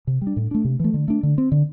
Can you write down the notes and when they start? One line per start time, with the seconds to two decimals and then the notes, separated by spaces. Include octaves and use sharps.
0.07 C3
0.21 G3
0.27 D4
0.36 A2
0.51 A3 D4
0.65 C3
0.80 E3 A3
0.94 D3
1.08 A3 D4
1.23 D3
1.38 C4
1.52 D3